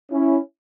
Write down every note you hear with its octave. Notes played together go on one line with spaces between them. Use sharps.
C#4 E4